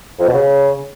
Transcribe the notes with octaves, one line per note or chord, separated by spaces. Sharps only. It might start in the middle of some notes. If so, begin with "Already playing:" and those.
F2
B2
C#3